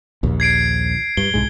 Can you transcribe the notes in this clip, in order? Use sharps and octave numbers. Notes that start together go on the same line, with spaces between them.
A#1 D#2
G#6 C7 D7
G2 G7
C2 G#2 G#3